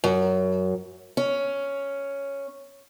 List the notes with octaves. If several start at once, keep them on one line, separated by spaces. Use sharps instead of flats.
F#2
C#4